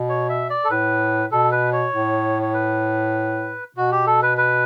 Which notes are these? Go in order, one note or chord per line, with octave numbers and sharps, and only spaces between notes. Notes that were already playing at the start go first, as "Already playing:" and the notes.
Already playing: B2
C#5
E5
D5
A4
A2 B4
B2 A4
B4
C#5
A2
C#5
B4
B2 F#4
G4
A4
B4
B4